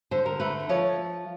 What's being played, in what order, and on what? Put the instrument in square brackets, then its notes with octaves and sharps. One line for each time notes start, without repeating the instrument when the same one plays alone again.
[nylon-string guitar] D3 C5
A#4
A3 B4
F3 C#5